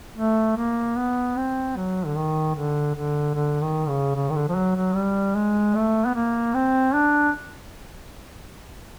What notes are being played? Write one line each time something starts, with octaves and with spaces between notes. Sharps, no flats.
A3
A#3
B3
C4
F#3
D3
D#3
D3
D3
D3
D#3
C#3
C#3
D#3
D3
F3
F#3
F#3
G3
G#3
A3
B3
A#3
C4
D4